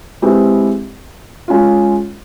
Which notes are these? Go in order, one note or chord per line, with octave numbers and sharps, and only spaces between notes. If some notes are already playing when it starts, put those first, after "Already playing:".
G#3 C4 E4 G4 B4
G#3 C#4 F4